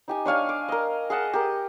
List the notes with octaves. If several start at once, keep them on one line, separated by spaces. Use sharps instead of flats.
D#4 G4 G#5
D4 C#5 F5 G#5
D6
A#4 D#5
G#4 D#5 F#5 A5
G4 A#4